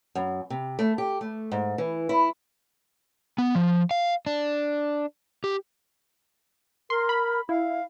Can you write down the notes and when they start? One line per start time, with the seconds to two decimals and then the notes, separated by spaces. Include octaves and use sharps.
0.15 F#2
0.50 C3
0.79 A3
0.98 G4
1.21 A3
1.52 G#2
1.78 E3
2.09 E4
3.38 B3
3.55 F3
3.91 F5
4.26 D4
5.44 G4
6.90 A#4 C6
7.09 B5
7.49 E4 F5